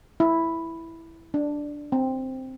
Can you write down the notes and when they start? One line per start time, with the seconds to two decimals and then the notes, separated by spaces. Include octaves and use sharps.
0.20 E4
1.34 D4
1.92 C4